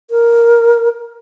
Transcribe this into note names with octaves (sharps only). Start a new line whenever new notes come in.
A#4